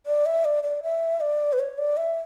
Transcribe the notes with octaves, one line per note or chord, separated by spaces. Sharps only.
D5
E5
D5
D5
E5
D5
B4
C#5
D5
E5